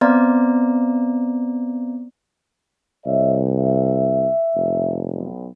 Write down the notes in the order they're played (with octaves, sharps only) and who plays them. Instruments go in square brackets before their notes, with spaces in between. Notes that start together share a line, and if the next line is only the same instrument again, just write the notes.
[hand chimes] B3 C4 D5 A#5
[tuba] C2 [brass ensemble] C#5 D#5 E5
[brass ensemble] E5
[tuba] F1
[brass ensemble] B1